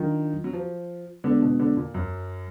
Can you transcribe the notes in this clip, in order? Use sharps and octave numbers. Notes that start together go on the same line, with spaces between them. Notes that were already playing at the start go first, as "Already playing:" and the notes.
Already playing: D#3 F#3 D4 F4
F#3
F3
D3 G#3 B3 D4
B2
D3
A#2
F#2